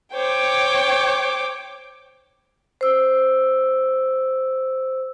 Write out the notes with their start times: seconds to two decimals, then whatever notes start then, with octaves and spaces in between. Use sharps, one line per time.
0.13 C5 C#5 G5 D6
2.81 C5 E6